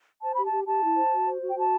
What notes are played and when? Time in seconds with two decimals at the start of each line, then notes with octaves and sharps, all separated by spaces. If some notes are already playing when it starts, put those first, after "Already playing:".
0.22 C5 A5
0.33 G4 B5
0.44 A5
0.51 G4
0.66 G4 A5
0.82 E4
0.96 C5
1.12 F#4
1.27 C5
1.42 F#4
1.51 G5
1.57 F#4 A5